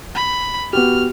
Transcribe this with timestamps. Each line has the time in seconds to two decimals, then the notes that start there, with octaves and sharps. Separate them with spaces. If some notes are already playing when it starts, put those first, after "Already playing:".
0.15 B5
0.73 B3 F#4 G4 F6